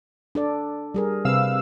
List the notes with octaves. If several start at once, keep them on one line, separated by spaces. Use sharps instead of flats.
D4 A4 D5
G3 G#4 A#4
C3 G3 B4 F5 E6